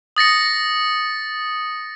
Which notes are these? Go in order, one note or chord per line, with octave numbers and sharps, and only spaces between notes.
D#6 A6 A#6 C#7